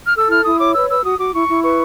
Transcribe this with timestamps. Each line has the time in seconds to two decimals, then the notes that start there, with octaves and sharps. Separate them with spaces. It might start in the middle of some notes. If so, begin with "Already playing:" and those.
0.07 F6
0.15 A4 E6
0.29 E4 F6
0.45 E4 D#6
0.59 C#5 D6
0.74 B4 E6
0.89 B4 E6
1.04 F#4 D#6
1.19 F#4 D6
1.34 E4 C#6
1.49 E4
1.64 B4 C#6